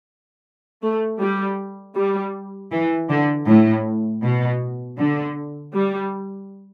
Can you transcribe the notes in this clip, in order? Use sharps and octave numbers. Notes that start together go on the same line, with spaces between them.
A3
G3
G3
E3
D3
A2
B2
D3
G3